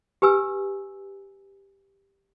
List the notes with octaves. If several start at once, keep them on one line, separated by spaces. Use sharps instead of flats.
G4 B4 G#5 E6